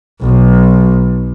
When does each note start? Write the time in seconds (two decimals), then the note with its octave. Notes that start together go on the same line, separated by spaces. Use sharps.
0.24 B1